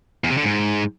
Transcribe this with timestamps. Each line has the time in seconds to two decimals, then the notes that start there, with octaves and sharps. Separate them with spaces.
0.24 E2
0.31 C3
0.37 D3
0.44 G#2